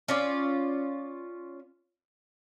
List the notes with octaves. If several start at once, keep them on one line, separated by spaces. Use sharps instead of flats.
C#4 F4 D5